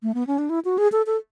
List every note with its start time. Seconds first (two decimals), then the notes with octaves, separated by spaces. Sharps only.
0.03 A3
0.14 B3
0.27 C#4
0.38 D4
0.50 E4
0.65 F#4
0.78 G#4
0.92 A4
1.07 A4